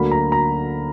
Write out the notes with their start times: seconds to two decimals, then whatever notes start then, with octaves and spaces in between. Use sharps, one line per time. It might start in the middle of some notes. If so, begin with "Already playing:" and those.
Already playing: D2 D3 F#3 A#3 B5
0.12 A#5
0.32 A#5